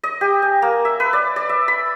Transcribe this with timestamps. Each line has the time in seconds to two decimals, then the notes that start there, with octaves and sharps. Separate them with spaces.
0.04 D#5
0.21 G4
0.42 G#5
0.62 A#3
0.85 E5
1.00 B4
1.13 D5
1.36 D5
1.49 E5
1.68 B5